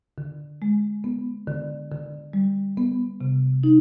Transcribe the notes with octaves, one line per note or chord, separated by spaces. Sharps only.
D3
G#3
B3
D3
D3
G3
B3
C3
D#4